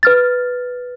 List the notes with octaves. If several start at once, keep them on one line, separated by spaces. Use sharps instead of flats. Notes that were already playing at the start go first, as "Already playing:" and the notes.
B4 F6 A6